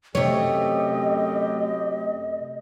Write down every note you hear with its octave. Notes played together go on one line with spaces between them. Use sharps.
F#2 C3 A3 G4 C#5 D#5